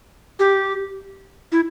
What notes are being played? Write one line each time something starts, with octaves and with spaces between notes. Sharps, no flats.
G4
E4